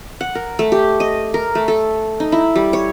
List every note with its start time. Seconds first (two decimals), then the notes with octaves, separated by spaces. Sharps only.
0.21 F#5
0.35 A#4
0.59 A3
0.72 G4
1.00 D#5
1.34 A#4
1.55 A3
1.68 A4
2.20 D#4
2.32 E4
2.56 G3
2.73 C#5